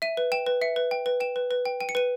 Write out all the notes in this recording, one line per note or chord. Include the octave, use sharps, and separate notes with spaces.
E5 D#7
B4
G5 E7
B4
E5 C#7
B4
G5
B4
G5 E7
B4
B4
G5
G5 D#7
C#7
B4 D#7